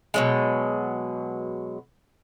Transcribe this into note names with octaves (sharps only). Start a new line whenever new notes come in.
B2 F#3 G#3